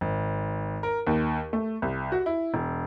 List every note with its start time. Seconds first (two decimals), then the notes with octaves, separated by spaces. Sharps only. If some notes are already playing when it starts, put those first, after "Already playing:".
0.01 G#1
0.83 A#4
1.07 D#2
1.53 A3
1.82 C2
2.12 F#4
2.26 E4
2.54 E1